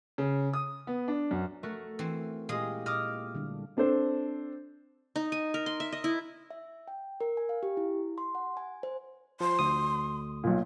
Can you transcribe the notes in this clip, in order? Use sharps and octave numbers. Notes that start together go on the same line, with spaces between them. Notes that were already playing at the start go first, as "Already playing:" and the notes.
C#3
D#6
B3
D4
F#2
A3 F#4 A#4
E3 C4
A#2 G#3 E4 G4 D#5 F5 D#6
A#2 D#5 D6 D#6 F6
D3 G3 D4
C4 D4 A4 C5
D#4
G#5
A#4
C6
E5
D#5
E4
E5
G5
A#4
G#5
F5
G4
E4
C6
F#5
G#5
C5
F3 C6
D2 D#6
B1 A#2